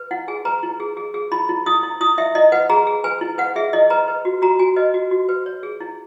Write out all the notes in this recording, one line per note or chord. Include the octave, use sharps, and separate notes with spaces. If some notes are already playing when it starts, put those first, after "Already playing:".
Already playing: B4
E4 F#5
G#4 G#5
B4 A#5
E4
G#4
G#4
G#4
E4 B5
E4
E4 D#6
E4
E4 D#6
E4 E5
E4 D#5
B4 F#5
G#4 A#5
G#4
B4 G#5
E4
B4 F#5
G#4 E5
E4 D#5
B4 A#5
B4
F#4
F#4 A#5
F#4 G#5
B4 D#5
F#4
F#4
B4
C#5
G#4
E4